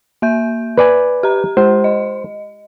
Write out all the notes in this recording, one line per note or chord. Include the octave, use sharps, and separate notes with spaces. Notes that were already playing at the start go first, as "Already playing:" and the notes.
A#3 E5 G6
B4 D5 G#5
G4 A#5
G#3 G4 C5
D#5